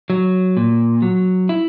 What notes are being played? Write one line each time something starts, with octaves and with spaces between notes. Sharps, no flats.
F#3
A#2
F#3
E4